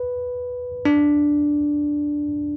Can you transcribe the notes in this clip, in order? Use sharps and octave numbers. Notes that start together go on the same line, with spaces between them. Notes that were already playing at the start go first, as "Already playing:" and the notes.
Already playing: B4
D4